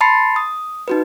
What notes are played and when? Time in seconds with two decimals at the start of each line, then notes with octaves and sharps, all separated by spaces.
0.01 A5 B5 C6 A6 C7 C#7
0.36 D#6
0.88 D#4 F#4 B4